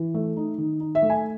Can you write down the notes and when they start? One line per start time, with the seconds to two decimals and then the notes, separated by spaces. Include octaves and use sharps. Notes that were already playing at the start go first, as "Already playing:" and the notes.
Already playing: E3
0.14 A3
0.36 D#4
0.58 D#3
0.80 D#4
0.95 E5
1.02 A3
1.10 G#5